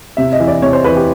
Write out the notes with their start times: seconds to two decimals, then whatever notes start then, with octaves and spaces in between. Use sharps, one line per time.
0.17 C3 E5
0.33 D#5
0.40 E3
0.48 D5
0.62 C3 C#5
0.73 C5
0.84 E3 B4
0.97 G4